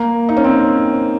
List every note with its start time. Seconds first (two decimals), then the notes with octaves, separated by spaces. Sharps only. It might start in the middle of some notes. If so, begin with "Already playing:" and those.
Already playing: A#3
0.29 D#4
0.37 C#4
0.44 C4